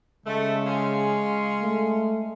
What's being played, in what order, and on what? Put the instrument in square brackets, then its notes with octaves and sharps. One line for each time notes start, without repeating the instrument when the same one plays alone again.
[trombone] C#3 [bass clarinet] G#3 [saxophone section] A3
[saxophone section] C#4 F4 G#4
[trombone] A3